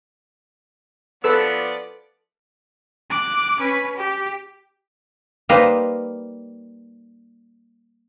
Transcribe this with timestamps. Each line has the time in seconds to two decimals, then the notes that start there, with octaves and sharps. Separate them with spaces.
1.24 F3 B3 A4 B4 D5 E6
3.10 D6 F#6
3.60 C#4 B4
3.97 G4
5.49 G3 A#3 D#4 B4 C5 D#5